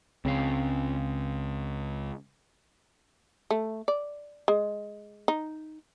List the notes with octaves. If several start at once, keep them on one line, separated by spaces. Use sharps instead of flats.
C#2 C#3 C4 F5
A3
D5
G#3
D#4